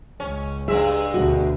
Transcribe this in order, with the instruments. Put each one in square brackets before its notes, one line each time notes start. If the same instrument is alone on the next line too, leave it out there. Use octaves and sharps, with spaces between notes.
[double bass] C#2 [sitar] C#4
[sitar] G2 G#3 E5 [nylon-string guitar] G#4
[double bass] D2 B2 [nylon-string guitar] F#4